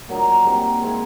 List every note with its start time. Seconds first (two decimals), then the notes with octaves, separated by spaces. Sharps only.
0.09 A#2 F#3 A#3 D#4
0.45 C3 D#3 G3 A#3
0.80 G#3 C4 E4 G#4